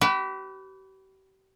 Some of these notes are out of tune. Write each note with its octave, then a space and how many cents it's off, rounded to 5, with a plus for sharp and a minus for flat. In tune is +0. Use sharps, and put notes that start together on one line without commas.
G4 -40 B4 +5